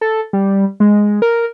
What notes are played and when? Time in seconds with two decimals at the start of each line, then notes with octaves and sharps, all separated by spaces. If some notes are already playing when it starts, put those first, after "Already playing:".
0.01 A4
0.33 G3
0.80 G#3
1.22 A#4